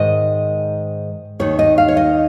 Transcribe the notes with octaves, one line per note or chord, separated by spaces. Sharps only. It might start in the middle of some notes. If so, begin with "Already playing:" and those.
Already playing: G#2 D#3 D#5
D#2 D#3 C#5
D#5
F5
C#5
D#5